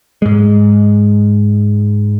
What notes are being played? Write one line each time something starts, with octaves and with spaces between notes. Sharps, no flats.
G#2 G#3